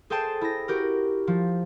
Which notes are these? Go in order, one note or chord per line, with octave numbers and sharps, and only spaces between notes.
G#4 A4 C5 G5 A5 E7
E4 A#6
F#4 G4 A#4
F3